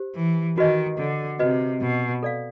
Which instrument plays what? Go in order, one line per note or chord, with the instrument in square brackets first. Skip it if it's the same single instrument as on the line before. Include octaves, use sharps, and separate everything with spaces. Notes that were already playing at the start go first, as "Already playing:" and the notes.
Already playing: [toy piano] G4 C5
[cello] E3
[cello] D#3 [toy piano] F#4 B4 D#5
[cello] D3
[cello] C3 [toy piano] F#4 B4 D#5
[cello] B2
[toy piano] A4 D5 F5